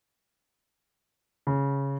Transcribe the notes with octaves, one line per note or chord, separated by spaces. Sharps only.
C#3